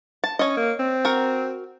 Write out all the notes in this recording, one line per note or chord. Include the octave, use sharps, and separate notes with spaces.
A5
C#4 C#5 D#5
A#3
C4
F#4 A#4